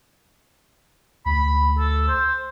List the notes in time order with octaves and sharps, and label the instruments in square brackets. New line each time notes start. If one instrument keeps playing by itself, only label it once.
[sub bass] D2 [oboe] B5
[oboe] A4
C5